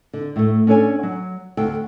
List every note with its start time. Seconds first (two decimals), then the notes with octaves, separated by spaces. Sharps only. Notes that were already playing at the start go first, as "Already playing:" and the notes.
0.13 D3
0.36 A2 A3
0.67 C#4 D4 A4 C#5 G#5
1.03 F#3
1.57 D2 A4 G5